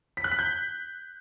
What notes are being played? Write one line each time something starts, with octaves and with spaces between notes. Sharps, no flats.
B6
F#6
B6
G6